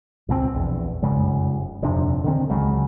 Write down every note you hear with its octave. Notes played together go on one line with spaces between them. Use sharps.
C#2 B2 A#3 C4
A#1 E2
F1 F#2 C#3 G#3
D#1 F2 C3 D4
D3 D#3 C4
C#2 C#3 F#3 G#3